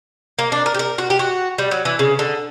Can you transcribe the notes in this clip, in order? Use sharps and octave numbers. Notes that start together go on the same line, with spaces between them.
A#3
D4
A#4
G4
A#4
F#4
G4
F#4
G3
F#3
E3
C#3
D3